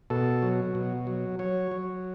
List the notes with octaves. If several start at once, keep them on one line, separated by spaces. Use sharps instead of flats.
B2 A4
F#3
B2
F#3
F#3 C#5
F#3